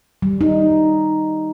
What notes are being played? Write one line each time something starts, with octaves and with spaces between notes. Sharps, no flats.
G3
D#4